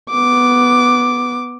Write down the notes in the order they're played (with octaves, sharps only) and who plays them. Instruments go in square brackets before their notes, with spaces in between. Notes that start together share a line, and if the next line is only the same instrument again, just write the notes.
[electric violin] B3 D6